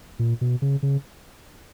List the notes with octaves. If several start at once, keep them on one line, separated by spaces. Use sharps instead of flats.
A#2
B2
C#3
C#3